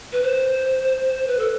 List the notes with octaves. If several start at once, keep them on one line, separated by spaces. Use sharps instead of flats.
B4
C5
B4
A4